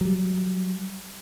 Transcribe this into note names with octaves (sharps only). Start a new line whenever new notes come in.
F#3 G3